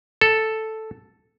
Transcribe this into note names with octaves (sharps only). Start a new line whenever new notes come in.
A4